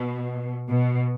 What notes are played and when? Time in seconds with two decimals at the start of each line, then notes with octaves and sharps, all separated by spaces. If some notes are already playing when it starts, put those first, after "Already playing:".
Already playing: B2
0.70 B2